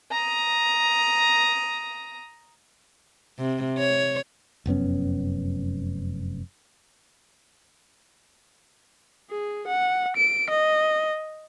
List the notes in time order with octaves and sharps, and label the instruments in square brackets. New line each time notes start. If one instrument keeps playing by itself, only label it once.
[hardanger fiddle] A#5 D#6
[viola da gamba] C3
C#5
[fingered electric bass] F1 F#2 B3 C#4
[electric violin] G#4
F#5
D7
D#5